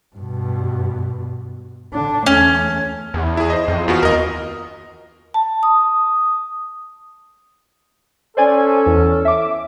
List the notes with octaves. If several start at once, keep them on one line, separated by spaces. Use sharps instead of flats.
G2 B2
D3 D4
E2 A3 C#4
E2
E4 G#4
C5 D#5
F2
E2 B3 F4 F#4
D#2 A#4 D#5
A5
D#6
C#4 A4 C5 D5 G#5
E2
E5 D6